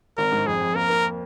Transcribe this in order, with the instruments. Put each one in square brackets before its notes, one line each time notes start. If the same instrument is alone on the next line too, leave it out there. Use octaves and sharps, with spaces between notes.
[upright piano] G#1 [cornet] A#4
[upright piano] G#2
[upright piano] F2 [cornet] G#4
[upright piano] F2
[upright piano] A#3 [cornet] A#4
[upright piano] A#3